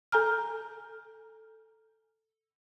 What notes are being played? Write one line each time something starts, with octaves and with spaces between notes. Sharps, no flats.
A4 G#5 A#5 F6